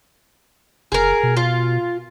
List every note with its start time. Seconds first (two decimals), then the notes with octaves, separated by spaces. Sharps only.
0.92 F#1 G#4 A#4
1.23 B2
1.37 F4